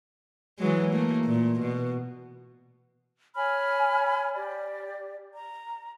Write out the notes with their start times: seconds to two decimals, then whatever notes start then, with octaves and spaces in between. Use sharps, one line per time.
0.58 E3 F#3 G#3
0.91 A3 A#3
1.25 A#2
1.60 B2
3.35 C#5 G#5 B5 F6
4.35 G4 D5
5.33 A#5